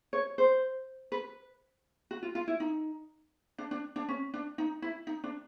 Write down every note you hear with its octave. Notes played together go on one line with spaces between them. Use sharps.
C#5
C5
B4
F#4
F4
F4
E4
D#4
D4
D4
D4
C#4
D4
D#4
E4
D#4
D4